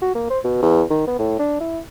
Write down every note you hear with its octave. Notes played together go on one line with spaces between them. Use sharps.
F#4
A#3
C5
B2
E2
D#3
B3
A2
D4
E4